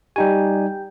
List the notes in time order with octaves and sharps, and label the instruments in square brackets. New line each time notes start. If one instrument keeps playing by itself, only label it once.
[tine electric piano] G3 D#4 G#5 [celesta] G4 G5 G6